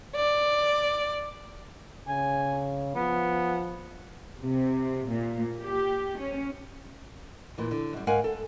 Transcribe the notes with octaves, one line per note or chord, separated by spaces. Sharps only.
D5
C#3 G#5
F3 B3
C3
A#2
G4
C#4
A#2 E3
D3
F#2 G3
G#2 A#4 F5 F#5 G#5
A4